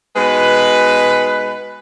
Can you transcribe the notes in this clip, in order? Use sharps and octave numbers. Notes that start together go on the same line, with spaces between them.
B2 G#3 D#4 B4